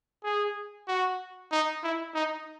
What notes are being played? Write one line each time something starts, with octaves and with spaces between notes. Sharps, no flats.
G#4
F#4
D#4
E4
D#4